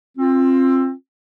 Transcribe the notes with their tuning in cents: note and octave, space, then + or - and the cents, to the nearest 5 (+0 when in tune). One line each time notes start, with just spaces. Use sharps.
C4 +25 F4 +0